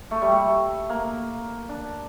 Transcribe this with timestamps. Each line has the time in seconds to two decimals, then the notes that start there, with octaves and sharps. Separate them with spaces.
0.11 A3
0.22 G3
0.32 A3
0.90 A#3
1.69 D4